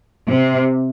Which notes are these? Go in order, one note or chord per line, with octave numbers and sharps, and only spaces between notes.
C3